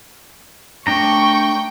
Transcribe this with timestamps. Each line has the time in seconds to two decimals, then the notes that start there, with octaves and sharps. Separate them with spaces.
0.87 A3 D4 G5 A#5 C#6